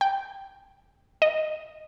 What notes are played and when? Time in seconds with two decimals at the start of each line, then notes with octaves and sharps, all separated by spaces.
0.01 G5
1.22 D#5